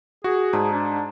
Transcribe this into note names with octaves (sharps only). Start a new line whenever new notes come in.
F#4 G#4
G#2 D5 A5 A#5
D4